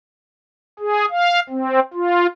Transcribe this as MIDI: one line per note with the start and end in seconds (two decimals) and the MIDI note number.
0.79 1.06 68
1.10 1.40 77
1.50 1.80 60
1.94 2.27 65